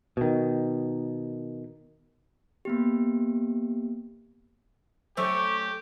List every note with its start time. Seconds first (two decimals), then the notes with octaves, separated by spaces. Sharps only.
0.17 B2 D#3
2.65 A#3 B3 G4
5.17 F#3 A3 C#4 G4 C5 C#6